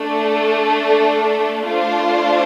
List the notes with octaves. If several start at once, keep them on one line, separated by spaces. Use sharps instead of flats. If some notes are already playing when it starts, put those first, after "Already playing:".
Already playing: A3 D4 A4
A3 D4 F4 C5